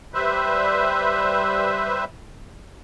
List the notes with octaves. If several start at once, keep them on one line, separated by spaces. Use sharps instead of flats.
G3 B4 C5 E5